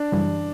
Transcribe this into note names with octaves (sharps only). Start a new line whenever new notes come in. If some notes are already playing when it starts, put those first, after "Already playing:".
Already playing: D4
F#2 C#3 E3 G3